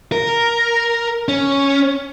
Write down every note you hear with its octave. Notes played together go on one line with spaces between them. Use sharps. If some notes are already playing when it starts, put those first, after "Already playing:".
A#4
C#4